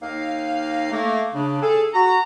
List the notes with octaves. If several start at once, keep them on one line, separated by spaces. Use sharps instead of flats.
D#2 A#3 D#4 F5
A3 A#3
C#3 D4
G#4 A4
F#4 A#5